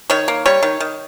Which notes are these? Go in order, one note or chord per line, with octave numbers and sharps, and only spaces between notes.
D#3 C#5
A#3
G3 C#5
D#3
D#3